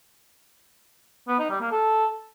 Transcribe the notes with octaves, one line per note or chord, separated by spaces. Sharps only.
B3
D#4
G3
A#3
A4